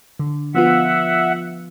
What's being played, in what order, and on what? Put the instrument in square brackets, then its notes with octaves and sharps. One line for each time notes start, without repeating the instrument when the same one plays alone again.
[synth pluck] D3
[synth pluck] F3 B3 F4 [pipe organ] E5 F#5